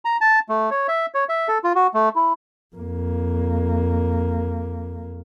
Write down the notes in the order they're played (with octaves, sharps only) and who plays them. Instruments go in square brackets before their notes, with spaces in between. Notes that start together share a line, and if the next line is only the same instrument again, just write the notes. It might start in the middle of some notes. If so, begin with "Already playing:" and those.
[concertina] A#5
A5
A3
C#5
E5
C#5
E5
A4
F4
F#4
A3
E4
[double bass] F2 A#3